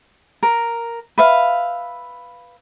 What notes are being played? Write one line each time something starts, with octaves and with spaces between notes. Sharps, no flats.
A#4
B4 E5 F5